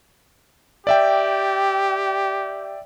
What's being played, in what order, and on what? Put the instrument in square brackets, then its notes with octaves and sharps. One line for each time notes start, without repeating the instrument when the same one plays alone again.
[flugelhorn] G4 [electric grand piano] D5 E5 G5